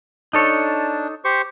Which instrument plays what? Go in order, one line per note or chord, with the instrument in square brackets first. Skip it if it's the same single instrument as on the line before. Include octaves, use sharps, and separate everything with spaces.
[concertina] D4 [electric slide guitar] D#4 A4 C#5
[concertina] G4 C5 C#6